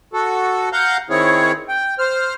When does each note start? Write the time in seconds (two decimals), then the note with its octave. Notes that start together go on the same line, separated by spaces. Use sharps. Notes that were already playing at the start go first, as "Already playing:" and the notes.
0.13 F#4 A4
0.73 F5 F#5 A#5 G6
1.10 D#3 C4 E4 G#4 C#5
1.69 G5
1.99 C5 F6